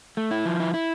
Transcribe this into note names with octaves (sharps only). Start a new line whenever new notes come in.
A3
E4
F3
E4
E4